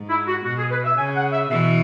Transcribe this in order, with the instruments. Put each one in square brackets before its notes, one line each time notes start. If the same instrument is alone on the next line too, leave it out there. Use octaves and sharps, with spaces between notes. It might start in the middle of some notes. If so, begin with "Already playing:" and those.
Already playing: [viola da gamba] G#2
[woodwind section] E4
F#4
[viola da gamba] B2 [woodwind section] F#4
[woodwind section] G#4
B4
E5
[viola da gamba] C#3 [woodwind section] G#5
[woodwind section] F#5
E5
[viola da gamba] B2 E3 [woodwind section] E5